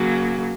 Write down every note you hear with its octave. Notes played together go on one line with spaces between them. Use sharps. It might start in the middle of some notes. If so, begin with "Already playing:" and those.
Already playing: C#3 F#3 A#3